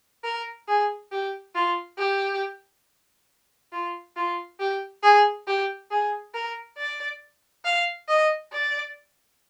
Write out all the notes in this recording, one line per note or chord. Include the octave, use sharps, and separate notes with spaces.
A#4
G#4
G4
F4
G4
F4
F4
G4
G#4
G4
G#4
A#4
D5
F5
D#5
D5